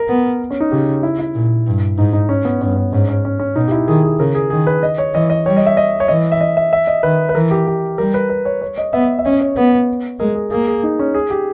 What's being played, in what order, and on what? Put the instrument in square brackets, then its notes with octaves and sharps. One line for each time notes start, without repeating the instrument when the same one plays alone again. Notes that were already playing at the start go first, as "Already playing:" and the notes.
Already playing: [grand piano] A#4
[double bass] B3
[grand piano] C#4
D#4
[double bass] C#3 [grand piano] G4
[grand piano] E4
E4
[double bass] A#2
G2
[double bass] G#2 [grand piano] D#4
[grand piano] D#4
C#4
B3
[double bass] G2 [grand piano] C#4
[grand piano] C#4
[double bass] G#2 [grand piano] C#4
[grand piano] C#4
C#4
C#4
[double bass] B2 [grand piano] D#4
[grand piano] G4
E4
[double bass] D#3 [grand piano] G#4
[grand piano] G#4
[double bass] C#3 [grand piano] A#4
[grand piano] G#4
[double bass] D#3 [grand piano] G#4
[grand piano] B4
D#5
C#5
[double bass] E3 [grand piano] D#5
[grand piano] D#5
[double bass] G3 [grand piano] C#5
[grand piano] D#5
E5
D#5
C#5
[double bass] E3 [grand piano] D#5
[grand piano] E5
D#5
E5
E5
D#5
[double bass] D#3 [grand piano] B4
[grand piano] B4
[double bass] E3 [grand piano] A#4
[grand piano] G4
G4
[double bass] G3 [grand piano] A#4
[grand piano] B4
B4
C#5
C#5
D#5
[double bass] B3 [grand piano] E5
[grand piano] E5
[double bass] C#4 [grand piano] D#5
[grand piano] C#5
[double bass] B3
[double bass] G#3 [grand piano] A#4
[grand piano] G#4
[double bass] A#3 [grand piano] G#4
[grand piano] G#4
D#4
C#4
G#4
G4